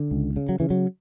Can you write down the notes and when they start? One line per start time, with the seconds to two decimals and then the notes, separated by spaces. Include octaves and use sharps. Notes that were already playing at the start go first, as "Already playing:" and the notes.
Already playing: D3
0.11 C#2
0.36 C#3
0.49 F#3
0.60 C#3 E3
0.70 F#3